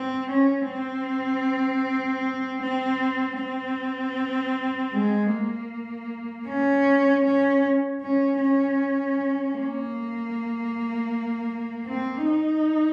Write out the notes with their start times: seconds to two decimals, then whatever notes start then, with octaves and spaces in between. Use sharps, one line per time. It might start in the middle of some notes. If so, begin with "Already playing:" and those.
Already playing: C4
0.30 C#4
0.70 C4
2.62 C4
3.39 C4
4.93 G#3
5.32 A#3
6.48 C#4
7.25 C#4
8.01 C#4
8.41 C#4
9.56 A#3
11.88 C4
12.26 D#4